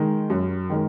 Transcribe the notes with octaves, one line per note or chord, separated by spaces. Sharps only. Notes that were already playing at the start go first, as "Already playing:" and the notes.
Already playing: D#3 G#3 D#4 A#4
F#2
D#3 G#3 D#4 A#4